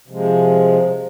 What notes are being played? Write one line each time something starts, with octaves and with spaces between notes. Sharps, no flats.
C3 F3 G#3